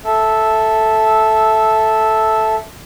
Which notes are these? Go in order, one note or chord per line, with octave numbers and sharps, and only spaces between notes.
A4 E5